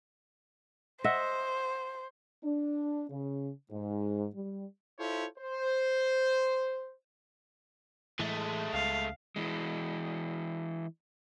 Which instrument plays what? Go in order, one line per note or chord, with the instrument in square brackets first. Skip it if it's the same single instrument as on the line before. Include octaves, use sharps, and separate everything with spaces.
[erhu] C5 [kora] D#5 E5 F#5
[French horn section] D4
C#3
G#2
G3
[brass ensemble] E4 F4 A4 C5 C#5
C5
[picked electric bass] A2 E3 [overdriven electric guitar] G#3 A3
[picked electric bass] C#2 [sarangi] F5
[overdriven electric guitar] E3 G#3